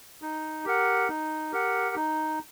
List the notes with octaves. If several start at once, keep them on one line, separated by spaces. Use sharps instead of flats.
D#4
G4 A#4 F#5
D#4
G4 A#4 F#5
D#4